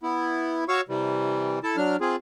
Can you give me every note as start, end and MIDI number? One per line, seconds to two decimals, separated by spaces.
0.03 0.64 59
0.03 0.64 64
0.69 0.81 66
0.69 0.81 73
0.69 0.81 77
0.69 0.81 85
0.69 0.81 88
0.89 1.59 48
0.89 1.59 52
0.89 1.59 55
1.63 1.76 64
1.63 1.76 69
1.63 1.76 81
1.77 1.96 54
1.77 1.96 62
1.77 1.96 89
2.01 2.16 60
2.01 2.16 65
2.01 2.16 68